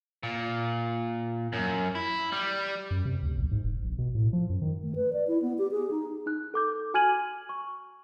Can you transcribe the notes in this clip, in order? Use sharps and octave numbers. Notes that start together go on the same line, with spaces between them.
A#2
F#2
E4
G3
F#2
C3
D2
A#1
G#2
E1
A#1
B2
A2
F3
F#2
D#3
A3
B4
D5
E4
B3
G4
G#4
D#4
D#4 F#6
A4 D6 G6
F#4 G#5 F6 G#6 D#7 F#7
C#6